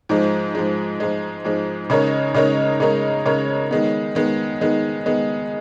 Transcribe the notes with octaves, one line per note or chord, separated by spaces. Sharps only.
G#2 F3 G#3
G#2 F3 G#3
G#2 F3 G#3
G#2 F3 G#3
C#3 G#3 D#4 A#4 C#5
C#3 G#3 D#4 A#4 C#5
C#3 G#3 D#4 A#4 C#5
C#3 G#3 D#4 A#4 C#5
D#3 G#3 B3
D#3 G#3 B3
D#3 G#3 B3
D#3 G#3 B3